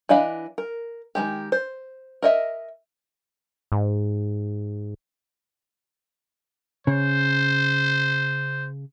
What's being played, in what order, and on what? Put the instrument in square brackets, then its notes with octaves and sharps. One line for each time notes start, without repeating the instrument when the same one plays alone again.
[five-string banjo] E3 D4 D#5 F5 B5
A#4
D#3 E3 G#3 G4
C5
A#4 D#5 E5
[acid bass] G#2
[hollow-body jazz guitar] C#3 [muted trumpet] C5